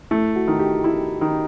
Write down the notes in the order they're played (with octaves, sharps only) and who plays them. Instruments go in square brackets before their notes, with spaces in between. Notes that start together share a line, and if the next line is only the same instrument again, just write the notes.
[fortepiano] A3 [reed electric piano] E4
[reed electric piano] F#4
[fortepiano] D#3
[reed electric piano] G4
[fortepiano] E4
D#3